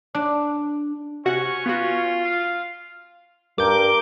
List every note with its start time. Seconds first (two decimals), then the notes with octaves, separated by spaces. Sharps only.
0.15 D4
1.25 C3 C#4 F#4 F#5 C#6
1.66 B3 F4 F#4
2.24 F5
3.58 G2 A#4 D6 G6